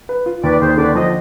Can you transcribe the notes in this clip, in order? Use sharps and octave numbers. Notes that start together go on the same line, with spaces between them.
B4
F4
D#2 B4 D5
D#2 G#4 C5
D3 B4 D5
F3 C5 D#5